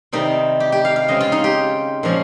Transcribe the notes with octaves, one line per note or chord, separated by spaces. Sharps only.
C3 D#3 G3 C4 D#4
G4
G4
F5
F5
C#3 G#3 C4 D#5
F4
D#4
G4
A#2 F3 G#3 C#4